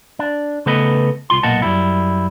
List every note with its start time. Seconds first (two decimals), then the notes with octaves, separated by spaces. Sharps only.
0.19 D4
0.66 C#3 A3 B3 A4 B4 D#5
1.30 C2 F4 C6
1.43 B1 A#2 A#3 D#5 F#5 A5
1.62 F#2 G3 E4